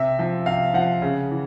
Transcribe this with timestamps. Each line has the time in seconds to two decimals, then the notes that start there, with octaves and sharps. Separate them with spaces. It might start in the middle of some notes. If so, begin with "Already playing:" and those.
Already playing: C3 E5
0.19 F3
0.46 C3 F5
0.74 F3 F#5
1.02 C#3
1.31 E3